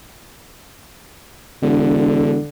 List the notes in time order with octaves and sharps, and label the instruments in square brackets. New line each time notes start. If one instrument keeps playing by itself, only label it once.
[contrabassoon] E1 [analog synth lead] D3